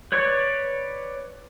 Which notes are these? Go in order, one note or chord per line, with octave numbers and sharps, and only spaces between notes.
B4 C#5 D5 C#6